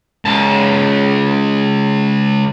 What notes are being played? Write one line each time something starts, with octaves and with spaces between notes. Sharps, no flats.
C#2 A5